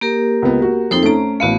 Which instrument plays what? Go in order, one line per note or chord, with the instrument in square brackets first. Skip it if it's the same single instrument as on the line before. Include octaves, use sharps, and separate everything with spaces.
[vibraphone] A#3 G4 A#4
[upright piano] C#2 B3
F#4
[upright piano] F2 C4 [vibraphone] D#4 A4 C5
[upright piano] A3 C#4 D7 [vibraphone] C5 A#5
[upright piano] A1 F5 [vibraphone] A3 B3 F#4